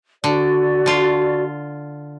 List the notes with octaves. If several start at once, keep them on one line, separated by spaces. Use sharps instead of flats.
D3 F#4 D5
D3 F4